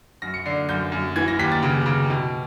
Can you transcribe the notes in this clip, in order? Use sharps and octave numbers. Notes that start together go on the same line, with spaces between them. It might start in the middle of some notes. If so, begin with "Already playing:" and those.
F#2 A#6
C#7
D3 C7
F#2 G6
F#2
E3 G#6
A#6
D#2 B6
A6
C#3
C#3
B2